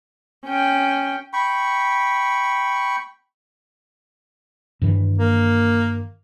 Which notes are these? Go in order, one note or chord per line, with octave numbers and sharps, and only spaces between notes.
C#4 G5
G5 B5 C#6
G2 D#3 E3
A#3